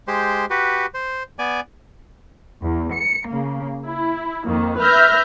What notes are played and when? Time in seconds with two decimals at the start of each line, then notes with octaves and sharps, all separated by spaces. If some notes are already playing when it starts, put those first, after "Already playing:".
0.08 G#3 G4 C5
0.50 F#4 G4 B4
0.94 C5
1.39 B3 D5 G#5
2.62 E2
2.93 C#7
3.27 C#3 A#3
3.85 E4
4.45 F2 D#3 A#3
4.80 B4 E5 F6 G6 A#6